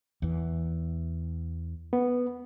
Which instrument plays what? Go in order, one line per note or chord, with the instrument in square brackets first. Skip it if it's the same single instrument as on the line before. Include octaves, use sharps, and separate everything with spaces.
[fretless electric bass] E2 E3
[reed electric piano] B3